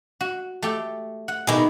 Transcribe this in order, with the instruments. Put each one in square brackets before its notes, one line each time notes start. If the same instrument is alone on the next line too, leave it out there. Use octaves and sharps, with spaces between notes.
[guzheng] F#4
A3 G4 A4
F#5
[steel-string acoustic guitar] B2 D#3 [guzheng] E4 G4 G#4